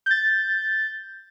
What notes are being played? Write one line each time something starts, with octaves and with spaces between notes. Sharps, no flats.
G6 A6